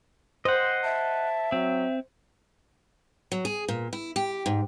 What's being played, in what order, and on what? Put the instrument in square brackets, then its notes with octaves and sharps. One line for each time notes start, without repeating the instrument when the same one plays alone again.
[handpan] C5 [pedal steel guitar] D#5 F#5
[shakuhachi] E5 [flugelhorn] A5
[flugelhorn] F#3 [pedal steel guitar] C4
[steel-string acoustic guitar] F#3
G#4
A#2
E4
G4
G#2